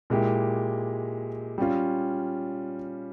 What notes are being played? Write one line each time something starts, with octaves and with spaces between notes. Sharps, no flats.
A#2 G#3 E4 G4
G3 C#4 F4